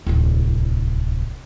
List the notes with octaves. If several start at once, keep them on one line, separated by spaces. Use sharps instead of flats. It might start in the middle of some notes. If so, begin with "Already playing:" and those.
D1 C2